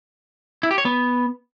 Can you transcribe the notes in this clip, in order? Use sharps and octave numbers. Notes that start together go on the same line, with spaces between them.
E4
G4
C#5
B3